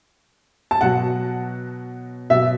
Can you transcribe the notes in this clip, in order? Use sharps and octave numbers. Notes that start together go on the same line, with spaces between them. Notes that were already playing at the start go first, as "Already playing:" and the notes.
A5
B2 F#3 F#5
B2 F#3 E5